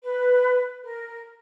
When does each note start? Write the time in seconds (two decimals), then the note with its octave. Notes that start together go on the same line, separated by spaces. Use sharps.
0.02 B4
0.82 A#4